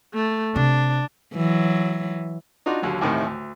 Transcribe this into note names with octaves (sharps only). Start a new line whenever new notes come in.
A3
C3 D4
E3 F#3
D4 D#4 F4 F#4
D#2 D3 F#3
D#2 A2 C3 D#3 E3
D2